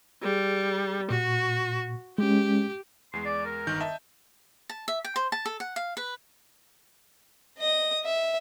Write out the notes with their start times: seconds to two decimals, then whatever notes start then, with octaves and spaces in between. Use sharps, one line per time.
0.23 G3 G#4
1.10 A#2 F#4
2.18 G#3 C#4 G4
3.13 E2 G#3 C6
3.25 D5
3.45 A#4
3.67 G1 D#3 G6
3.80 D#5 E5 A5
4.70 A5
4.88 E5
5.05 G5
5.16 C5
5.32 A5
5.46 A4
5.60 F#5
5.76 F5
5.97 B4
7.58 D#5 D#6
8.04 E5